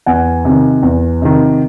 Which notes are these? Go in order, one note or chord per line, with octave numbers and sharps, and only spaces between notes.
E2 F#5 G#5
C3 D#3
E2
C3 D#3